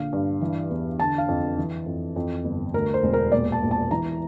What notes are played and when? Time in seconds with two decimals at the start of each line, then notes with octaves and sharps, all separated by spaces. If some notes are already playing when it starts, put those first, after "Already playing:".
Already playing: A#1 D3 F5
0.12 G2
0.41 E3
0.70 E2
0.99 D3 A5
1.18 F5
1.28 F2
1.58 E3
1.86 F2
2.16 F2
2.44 G1
2.73 D2 A#4
2.94 C5
3.03 E1
3.13 A#4
3.32 A#2 D5
3.52 A5
3.61 A#1
3.71 A5
3.91 E3 A#5